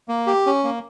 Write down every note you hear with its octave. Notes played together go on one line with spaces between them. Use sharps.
A#3
G4
C#4
A#3